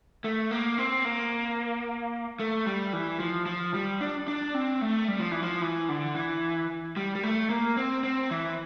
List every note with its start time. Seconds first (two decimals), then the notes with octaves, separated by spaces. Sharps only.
0.24 A3
0.51 A#3
0.78 C4
1.05 A#3
2.40 A3
2.66 G3
2.93 E3
3.20 F3
3.46 F3
3.74 G3
4.01 D4
4.28 D4
4.54 C4
4.82 A3
5.08 G3
5.20 F3
5.31 E3
5.43 F3
5.62 E3
5.89 D3
6.16 E3
6.97 G3
7.15 G3
7.23 A3
7.50 A#3
7.77 C4
8.04 C4
8.31 E3